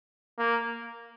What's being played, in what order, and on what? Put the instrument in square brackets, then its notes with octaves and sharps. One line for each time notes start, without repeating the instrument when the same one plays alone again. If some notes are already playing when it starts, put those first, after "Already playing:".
[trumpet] A#3